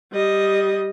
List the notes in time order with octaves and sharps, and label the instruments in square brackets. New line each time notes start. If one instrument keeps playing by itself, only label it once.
[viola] G3 D#5